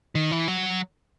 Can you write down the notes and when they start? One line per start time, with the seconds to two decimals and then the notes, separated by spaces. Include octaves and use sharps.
0.15 D#3
0.31 E3
0.48 F#3